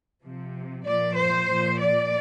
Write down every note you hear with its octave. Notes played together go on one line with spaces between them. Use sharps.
C3 F3
A#2 F3 D5
C5
A#2 F3
D5